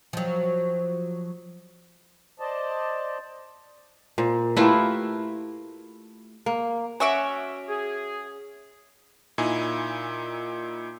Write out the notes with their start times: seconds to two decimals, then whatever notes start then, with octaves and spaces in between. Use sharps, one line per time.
0.13 F3 F#3
2.40 C5 D5 D#5 A5
4.18 A#2 C5
4.57 A3 E4 F4 G4 A#4 B4
6.46 A#3
7.00 C#4 F#4 E5 D6
7.69 G#4
9.38 A#2 D#4 E4 G#5